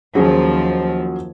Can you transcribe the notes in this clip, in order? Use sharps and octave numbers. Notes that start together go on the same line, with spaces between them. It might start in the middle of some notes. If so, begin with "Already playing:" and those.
D#2 F3 F#3 C#4 G#4